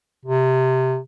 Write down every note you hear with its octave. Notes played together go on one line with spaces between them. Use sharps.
C3